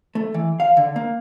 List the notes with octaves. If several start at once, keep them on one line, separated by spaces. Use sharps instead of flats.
A3
E3
F5
D3
A#3